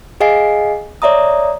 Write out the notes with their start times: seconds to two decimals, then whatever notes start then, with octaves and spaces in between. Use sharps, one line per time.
0.20 G#4 D#5 F5 G#5 C7
1.02 C#5 D5 E5 A#5 D#6